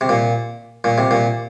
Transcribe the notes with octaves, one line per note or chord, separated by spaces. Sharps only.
C3
A#2
A#2
C3
A#2